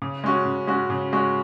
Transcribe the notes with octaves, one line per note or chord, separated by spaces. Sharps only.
C#3
G#3 C#4 F#4
C#3
G#3 C#4 F#4
C#3
G#3 C#4 F#4